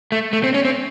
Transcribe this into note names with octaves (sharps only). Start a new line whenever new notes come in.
A3
A3
C4
C#4
C4